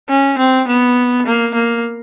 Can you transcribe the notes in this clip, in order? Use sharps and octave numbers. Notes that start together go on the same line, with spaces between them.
C#4
C4
B3
A#3
A#3